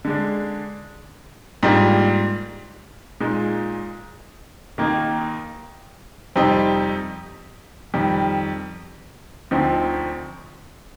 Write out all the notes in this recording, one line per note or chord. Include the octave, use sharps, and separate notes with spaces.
D3 G#3 D4
G#2 G3 A#3 D4 F4
A#2 G#3 D#4
D#2 D#3 A#3 D#4
F2 C3 G3 C4 D#4
F2 D#3 G3
D2 D3 F3 C4 D#4